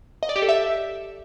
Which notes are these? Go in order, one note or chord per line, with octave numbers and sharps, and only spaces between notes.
D#5
D5
G4
A4
E5